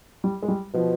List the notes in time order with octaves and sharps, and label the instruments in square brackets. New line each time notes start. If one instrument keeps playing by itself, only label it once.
[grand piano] G3
G#3
G3
[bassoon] B2 [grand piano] F3